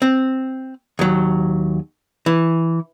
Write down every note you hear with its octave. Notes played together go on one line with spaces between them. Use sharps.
C4
D#2 F#3
E3